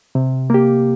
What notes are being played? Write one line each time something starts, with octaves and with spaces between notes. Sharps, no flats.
C3
A#3 G4